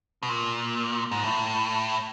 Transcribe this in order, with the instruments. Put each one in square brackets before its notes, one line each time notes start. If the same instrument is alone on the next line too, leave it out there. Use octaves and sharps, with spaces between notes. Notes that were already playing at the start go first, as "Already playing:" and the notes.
[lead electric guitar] B2
A#2
G#2
A2